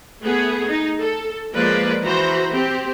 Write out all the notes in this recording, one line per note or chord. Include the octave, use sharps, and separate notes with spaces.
A3 B3 G#4
D#4
A4
F3 G#3 A#3 B4 D5
E3 F#4 C5 A#5 B5
C4 G4